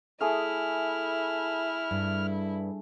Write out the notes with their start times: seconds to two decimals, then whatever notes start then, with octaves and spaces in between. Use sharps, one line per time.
0.21 A3 E4 G#4 D#6 F6
1.91 G2